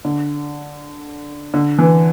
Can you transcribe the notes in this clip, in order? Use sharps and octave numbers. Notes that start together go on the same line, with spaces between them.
D3
D3
E3